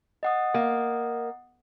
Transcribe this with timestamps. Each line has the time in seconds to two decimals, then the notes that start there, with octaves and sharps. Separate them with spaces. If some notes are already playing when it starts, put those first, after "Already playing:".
0.23 D#5 F#5 D#6
0.54 A#3